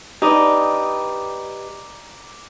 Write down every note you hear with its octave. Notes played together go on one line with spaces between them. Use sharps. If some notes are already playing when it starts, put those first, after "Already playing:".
D#4 G4 B4 D5 D#5